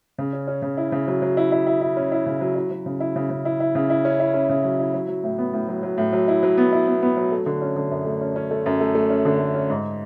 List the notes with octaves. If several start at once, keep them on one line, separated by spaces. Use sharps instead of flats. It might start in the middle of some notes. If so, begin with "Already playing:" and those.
C#3
C#4
C#4
C#3
E4
C#3
F#3
F#3
E4
E4
E4
E4
C#4
E4
C#3
F#3
E4
F#3
C#3
E4
C#3
C#3
E4
E4
C#3
E4
C#4
E4
C#4
C#3
F#3
E4
F#3
F#3
A2
B3
A2
F#3
F#3
A2
F#3
E4
F#3
B3
E4
B3
B3
F#3
A3
D3
C#4
D3
F#2
A3
C#4
C#4
A3
F#2
A3
A3
C#4
D3
A3
C#4
G#2